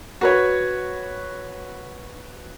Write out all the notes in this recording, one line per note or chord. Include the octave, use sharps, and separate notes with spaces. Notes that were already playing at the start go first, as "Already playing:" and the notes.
F#4 B4 C#5